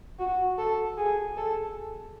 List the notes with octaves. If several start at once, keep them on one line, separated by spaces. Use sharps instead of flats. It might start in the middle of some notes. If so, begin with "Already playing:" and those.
F#4
A4
G#4
A4